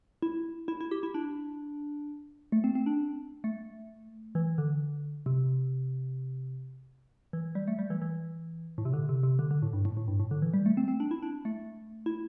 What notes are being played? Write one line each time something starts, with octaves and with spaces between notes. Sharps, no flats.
E4
E4
E4
G4
E4
D4
A3
C4
C4
D4
A3
E3
D3
C3
E3
G3
A3
G3
E3
E3
A2
C3
D3
C3
C3
D3
D3
A2
G2
A2
A2
G2
A2
D3
E3
G3
A3
C4
C4
D4
E4
D4
A3
E4